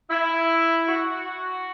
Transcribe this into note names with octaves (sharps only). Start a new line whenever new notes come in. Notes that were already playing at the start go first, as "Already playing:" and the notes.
E4
F#4